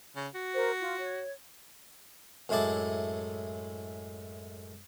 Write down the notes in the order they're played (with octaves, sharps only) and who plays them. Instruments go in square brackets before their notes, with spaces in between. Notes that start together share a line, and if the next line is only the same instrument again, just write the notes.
[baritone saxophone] C#3
F#4
[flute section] A#4 C5
F4
C#5
[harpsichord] F#2 A2 G#3 E4 A5 D6